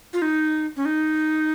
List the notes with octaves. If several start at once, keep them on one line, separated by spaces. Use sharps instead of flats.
F4
D#4
C#4
D#4